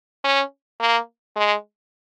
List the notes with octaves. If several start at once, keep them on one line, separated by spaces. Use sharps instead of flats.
C#4
A#3
G#3